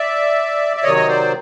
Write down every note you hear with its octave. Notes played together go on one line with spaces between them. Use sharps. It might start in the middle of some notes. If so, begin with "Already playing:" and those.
Already playing: D5 E5
E5
C3 D#3 F#3 C#5 D#5
D#5
C5 D5